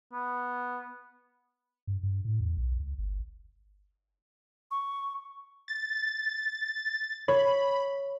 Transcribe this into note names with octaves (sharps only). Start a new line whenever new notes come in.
B3
G2
G2
A2
E2
B1
C#2
G1
C#6
A6
C#5 B5